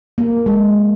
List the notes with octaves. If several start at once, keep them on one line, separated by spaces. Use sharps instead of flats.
A#3
G#3